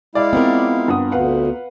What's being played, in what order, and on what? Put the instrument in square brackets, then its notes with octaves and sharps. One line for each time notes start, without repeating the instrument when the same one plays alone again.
[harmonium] G#3 E4 F5 [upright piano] D5
[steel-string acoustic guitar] B3 F4 A#4 [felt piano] C4
[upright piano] G2 F#5 D#6
[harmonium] D2 [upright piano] B4 F5 F#5